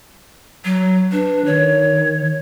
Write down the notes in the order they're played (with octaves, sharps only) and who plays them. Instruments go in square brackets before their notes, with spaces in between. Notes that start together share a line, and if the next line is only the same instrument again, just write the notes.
[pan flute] F#3
[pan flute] D4 [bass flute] B4
[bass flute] D#3 [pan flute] C#5